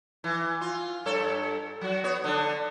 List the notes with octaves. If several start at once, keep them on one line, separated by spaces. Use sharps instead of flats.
E3
F4
G2 A4 C#5
F#3 F#4
B3 C#5
D3 D4